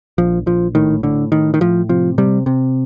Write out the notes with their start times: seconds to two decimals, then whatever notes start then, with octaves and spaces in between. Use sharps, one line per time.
0.18 A#1 F3
0.46 A#1 F3
0.75 A2 D#3
1.03 A2 D3
1.32 A2 D#3
1.54 D#3
1.60 A2 F3
1.89 C3 F3
2.18 C3 G3
2.46 C3